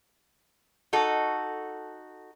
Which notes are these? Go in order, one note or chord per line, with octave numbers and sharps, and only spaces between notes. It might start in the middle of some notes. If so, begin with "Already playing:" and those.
D#4 F#4 A4